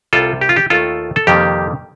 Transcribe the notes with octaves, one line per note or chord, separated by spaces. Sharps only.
C2 C3 G3 F4 A4
G4
F4
G4
D#2 D#3 A3 F4 A4
A4
F2 C3 D#3 G3 A#3 G4